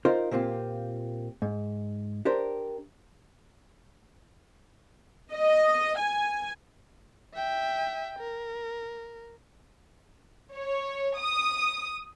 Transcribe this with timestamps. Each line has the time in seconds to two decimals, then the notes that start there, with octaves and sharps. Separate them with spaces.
0.05 D#4 F4 A#4 C5
0.31 A#2 A#3 C4 F4 G4
1.42 G#2
2.25 D4 G4 A#4 C5
5.32 D#5
5.99 G#5
7.35 E5 G5
8.20 A#4
10.54 C#5
11.19 D#6